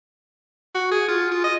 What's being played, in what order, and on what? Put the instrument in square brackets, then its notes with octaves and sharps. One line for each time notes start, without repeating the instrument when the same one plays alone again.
[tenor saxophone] F#4
G#4
F4
F4
D#5